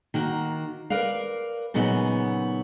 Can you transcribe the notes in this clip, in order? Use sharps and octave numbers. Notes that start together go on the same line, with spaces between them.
D#3 A#3 F#4
A#4 B4 D5 F5
A#2 C#3 F#3 B3 D#4